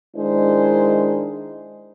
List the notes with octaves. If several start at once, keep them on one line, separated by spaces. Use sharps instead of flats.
D#3 G#3 D4 E4 A#4 C5